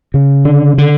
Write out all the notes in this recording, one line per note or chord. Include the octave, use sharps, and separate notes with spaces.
C#3
D3
D3